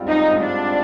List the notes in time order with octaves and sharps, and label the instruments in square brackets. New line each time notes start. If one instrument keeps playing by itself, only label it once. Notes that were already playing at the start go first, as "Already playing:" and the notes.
Already playing: [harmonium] G#2 G3 C4 F4
[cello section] D#4
D4